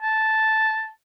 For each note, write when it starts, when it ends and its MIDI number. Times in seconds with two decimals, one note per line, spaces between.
0.02 0.90 81